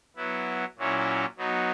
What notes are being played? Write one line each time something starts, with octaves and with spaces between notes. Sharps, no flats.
F#3 B3 E4
A#2 F#3 C#4 E4
F#3 B3 D#4